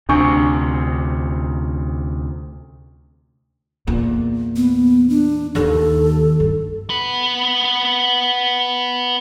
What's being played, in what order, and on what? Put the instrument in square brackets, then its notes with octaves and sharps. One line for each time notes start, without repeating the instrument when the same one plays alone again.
[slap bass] D2 C3 [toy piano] D4 G#5 C#6
[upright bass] E2 A#2
[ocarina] B3
D4
[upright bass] D#2 D#3 [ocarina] A4
[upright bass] G2
[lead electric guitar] B3 B4